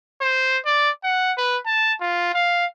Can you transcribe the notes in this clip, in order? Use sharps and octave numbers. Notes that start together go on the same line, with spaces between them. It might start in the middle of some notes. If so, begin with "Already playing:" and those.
C5
D5
F#5
B4
A5
F4
F5